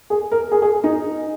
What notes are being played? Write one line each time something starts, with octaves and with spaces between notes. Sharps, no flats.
G#4
A#4
G#4
G#4
D#4